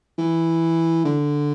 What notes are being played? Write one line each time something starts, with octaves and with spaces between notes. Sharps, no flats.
E3
D3